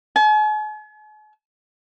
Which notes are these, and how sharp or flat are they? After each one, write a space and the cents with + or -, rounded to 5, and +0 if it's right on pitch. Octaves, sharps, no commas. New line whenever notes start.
G#5 +45